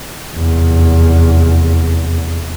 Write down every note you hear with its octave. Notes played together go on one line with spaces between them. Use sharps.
F1 E2